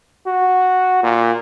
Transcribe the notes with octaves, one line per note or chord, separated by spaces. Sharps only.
F#4
A#2